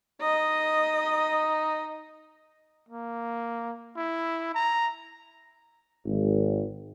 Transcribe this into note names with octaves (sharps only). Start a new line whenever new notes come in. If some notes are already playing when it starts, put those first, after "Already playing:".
D#4 D#5
A#3
E4
A#5
G#1